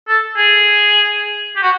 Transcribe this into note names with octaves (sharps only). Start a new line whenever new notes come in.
A4
G#4
G4
F#4